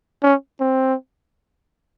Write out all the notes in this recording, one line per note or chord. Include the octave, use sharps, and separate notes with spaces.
C#4
C4